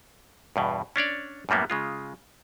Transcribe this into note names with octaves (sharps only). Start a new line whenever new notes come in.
E2 G2 B2
C#4 D4 C#5 D5
F#2 A2 G3 A#3 B3
C#3 G#3 F4